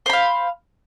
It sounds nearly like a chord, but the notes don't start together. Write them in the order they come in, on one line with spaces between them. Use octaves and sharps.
C5 B5 F5